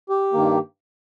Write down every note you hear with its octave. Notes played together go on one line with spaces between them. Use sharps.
G4
G2 D#3 A#3